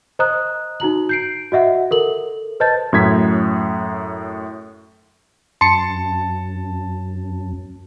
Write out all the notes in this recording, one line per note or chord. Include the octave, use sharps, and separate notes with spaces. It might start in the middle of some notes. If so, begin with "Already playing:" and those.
C5 D#5 A#5 D#6 F#6
D#4 F#4 A#5 F#7
G6 C7 D7
F#4 D#5 E5 F#5
A4 A#4 F#7
B4 C5 D#5 A5 G6 A6
F#2 A2 G#6 B6
F#2 A5 C6 C#7